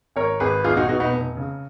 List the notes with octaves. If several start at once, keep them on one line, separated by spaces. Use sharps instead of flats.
G#1 A#4 C#5
G#1 G#4 B4
B1 F4 G#4
D#4 F#4
B2 D#4 F#4
B3 D#4
F1
C#3